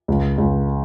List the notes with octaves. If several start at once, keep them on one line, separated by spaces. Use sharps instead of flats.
C#2
C#2